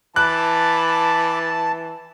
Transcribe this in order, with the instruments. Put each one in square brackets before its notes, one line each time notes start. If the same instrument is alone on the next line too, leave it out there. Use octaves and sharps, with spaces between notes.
[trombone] E3 [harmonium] A5 [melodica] B5 D6 [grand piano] F#6